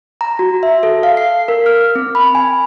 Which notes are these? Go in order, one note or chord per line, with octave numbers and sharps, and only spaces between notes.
A#5
F#4
E5
A4
F5
C7
A#4
F6
C4
B5
G#5